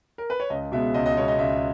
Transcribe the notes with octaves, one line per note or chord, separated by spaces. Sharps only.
A#4
B4
C#5
C#2 D#5
B2 G#3 B3 E5
C#2 D#5
D#5
B2 G#3 B3 C#5
D#5
C#2 E5